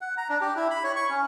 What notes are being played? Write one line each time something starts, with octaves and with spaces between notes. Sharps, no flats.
F#5
A#5
D4
G4
E4
B5
C#5
C#6
C#4